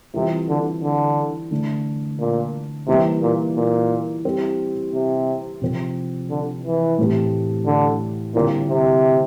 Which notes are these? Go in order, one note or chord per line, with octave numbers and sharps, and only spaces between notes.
C3 E3 G3 C4 F4
D3
D3
D3 A3 D4
A#2
C3 E3 G3 A#3
A#2
A#2
G3 C4 E4 G4
C3
C3 F3 C4
D3
E3
A2 E3 A3 C4 G4
D3
A#2 D3 G3 C4 E4
C3